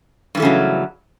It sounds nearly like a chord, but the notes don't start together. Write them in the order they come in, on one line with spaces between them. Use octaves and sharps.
G2 E3 A3 C#3 F#3